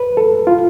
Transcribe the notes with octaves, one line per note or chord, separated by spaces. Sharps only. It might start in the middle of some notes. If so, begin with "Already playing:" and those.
Already playing: B4
A4
F4